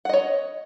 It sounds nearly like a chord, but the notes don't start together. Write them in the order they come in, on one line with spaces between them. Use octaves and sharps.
F#5 D#5 C#5